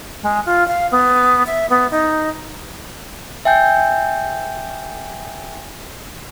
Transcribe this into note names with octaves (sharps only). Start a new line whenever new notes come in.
G#3
F4
F5
B3
E5
B3
D#4
E5 G5 G#5 G6